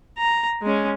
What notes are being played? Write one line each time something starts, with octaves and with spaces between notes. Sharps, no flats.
A#5
G#3 C#4